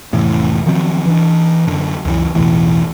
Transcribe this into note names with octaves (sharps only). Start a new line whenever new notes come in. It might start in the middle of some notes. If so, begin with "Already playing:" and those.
F1 A2 E3
D#3 F3 F#3 C4
E3 D4
F#2 D3
C#2 F#2 E3
B1 E2 A2 E3